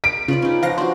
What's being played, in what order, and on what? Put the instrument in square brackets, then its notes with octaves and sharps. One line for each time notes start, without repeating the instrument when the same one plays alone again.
[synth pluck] B6 [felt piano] D7
[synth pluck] C#3 [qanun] F4 B4 D5
[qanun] C#4 D#4
[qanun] F3 [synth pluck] F5 F#5 A#6
[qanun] D4 F#4 [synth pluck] C5